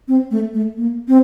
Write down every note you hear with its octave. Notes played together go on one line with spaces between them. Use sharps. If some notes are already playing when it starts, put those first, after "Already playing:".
C4
A3
A3
A#3
C4